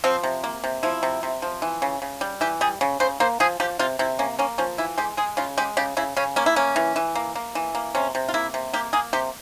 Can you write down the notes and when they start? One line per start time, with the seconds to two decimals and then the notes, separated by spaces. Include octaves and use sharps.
0.04 F3 C4
0.23 C3
0.44 A#3
0.64 C3
0.83 F3 E4
1.03 C3
1.23 C3
1.42 F3
1.62 E3
1.82 C#3
2.02 C#3
2.21 G3
2.41 E3 G4
2.61 G3 G#4
2.81 C#3
3.00 C#3 C5
3.20 A#3 C5
3.40 F3 G#4
3.60 F3 G4
3.79 C3 F4
3.99 C3 E4
4.19 A#3 C#4
4.39 A#3 C#4
4.58 F3 C#4
4.78 E3 E4
4.98 G#3 G4
5.17 G#3 G#4
5.37 C#3 F4
5.57 G#3 G4
5.77 C#3 G4
5.97 C#3 E4
6.17 C#3 C#4
6.36 A#3 C#4
6.46 E4
6.56 A#3 C#4
6.76 E3
6.96 E3
7.15 A#3
7.35 A#3
7.55 E3
7.75 A#3
7.95 C3 C#4
8.15 C3
8.29 F4
8.34 A#3 E4
8.54 C3
8.73 A#3 G4
8.93 A#3 G#4
9.13 C3 G4